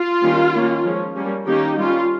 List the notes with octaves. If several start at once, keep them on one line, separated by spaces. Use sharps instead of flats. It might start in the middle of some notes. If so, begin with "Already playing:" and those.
Already playing: F4
D#3 G3 A#3 C#4
D#3 A#3 C#4
F3 G#3 C#4
G3 A#3 C#4
D#3 A#3 C#4 D#4 G4
G3 C#4 F4